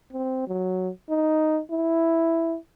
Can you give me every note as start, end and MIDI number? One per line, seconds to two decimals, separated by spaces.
0.13 0.43 60
0.47 0.89 54
1.09 1.60 63
1.71 2.57 64